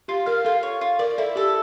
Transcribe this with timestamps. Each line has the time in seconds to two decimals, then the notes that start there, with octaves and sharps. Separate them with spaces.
0.08 F4 G4
0.26 A#4 F5
0.45 F4 A4
0.63 C#5
0.81 F4
0.99 A#4 D5
1.18 E4 A4
1.36 G4 A4